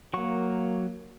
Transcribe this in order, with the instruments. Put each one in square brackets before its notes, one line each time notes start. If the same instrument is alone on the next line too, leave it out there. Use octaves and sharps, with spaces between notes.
[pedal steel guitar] F#3 C#6 [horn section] A#3